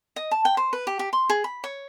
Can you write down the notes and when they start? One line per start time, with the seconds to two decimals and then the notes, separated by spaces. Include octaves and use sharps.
0.16 D#5
0.31 A5
0.45 G5
0.57 C5
0.73 B4
0.87 G4
0.99 G4
1.13 C6
1.30 G#4
1.44 B5
1.64 C#5